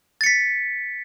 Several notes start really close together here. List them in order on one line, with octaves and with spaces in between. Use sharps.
A6 C#7 B6